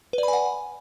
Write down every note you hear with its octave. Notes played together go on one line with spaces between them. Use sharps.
B4 D5 F#5 G#5 B5